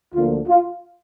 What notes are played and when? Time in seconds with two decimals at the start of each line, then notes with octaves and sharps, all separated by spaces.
0.14 D2 D3 F3 A#3 F4
0.47 F4